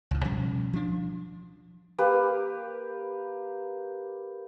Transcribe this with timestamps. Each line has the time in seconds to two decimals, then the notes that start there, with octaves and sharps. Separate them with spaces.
0.11 C#2 A2
0.24 B2 F3 G3 C#4
0.73 F3 D4
1.98 A#3 G4 B4